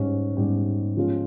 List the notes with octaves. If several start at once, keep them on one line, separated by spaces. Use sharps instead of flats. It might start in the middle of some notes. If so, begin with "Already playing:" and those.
Already playing: G#2 G3 C#4 G4
G#2 G3 C#4 G4
F3 G#3 C#4 F4